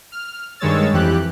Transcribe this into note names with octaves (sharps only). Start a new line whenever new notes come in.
F6
G2 D#3 G#3 C#5 E6 A6
F2 E3 G4 F#6